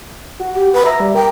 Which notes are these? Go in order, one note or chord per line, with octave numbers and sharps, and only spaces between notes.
F#4
G4
B4
E5 A#5
G3
A#4 G5